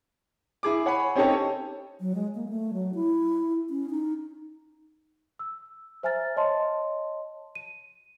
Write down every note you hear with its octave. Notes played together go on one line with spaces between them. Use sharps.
E4 G#4 D6
C#5 F#5 G#5 B5
C4 C#4 D#4 G4 A4 C#5
F#3
G#3
A#3
A3
F#3
E4
C#4
D#4
E6
C5 E5 G#5 A#5 F6 A6
C#5 D#5 A5 C6
D#7